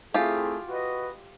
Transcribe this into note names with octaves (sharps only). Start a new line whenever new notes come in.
A3 C4 E4 F4 G4 G#4
F#4 B4 D#5